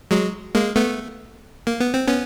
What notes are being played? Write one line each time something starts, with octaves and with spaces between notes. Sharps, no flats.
F#3 G#3
G#3 A#3
A3 B3
A#3
B3
C4
B3 C#4